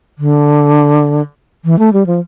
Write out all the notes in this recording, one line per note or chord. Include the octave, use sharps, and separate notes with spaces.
D3
E3
A3
G3
F3